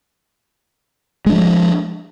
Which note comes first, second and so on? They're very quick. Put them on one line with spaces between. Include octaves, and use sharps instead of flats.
G#3 D4 F3